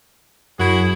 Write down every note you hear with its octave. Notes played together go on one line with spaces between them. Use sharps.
F#2 E4 F#4 G#4